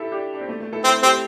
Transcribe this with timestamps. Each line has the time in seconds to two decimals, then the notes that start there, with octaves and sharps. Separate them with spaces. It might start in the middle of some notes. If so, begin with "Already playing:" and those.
Already playing: E4 G4 A4
0.12 D4 G4
0.34 D4
0.41 C4
0.49 A3
0.60 A3
0.72 E4 A4
0.84 C4 E4 A4
1.03 C4 G4 C5